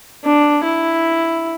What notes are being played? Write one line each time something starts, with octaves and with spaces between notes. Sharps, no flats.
D4
E4